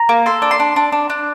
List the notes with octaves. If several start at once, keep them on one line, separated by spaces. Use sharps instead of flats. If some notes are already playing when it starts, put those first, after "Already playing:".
Already playing: A#5
A#3
A4 C6
D4
C6
D4
D4
D4
D4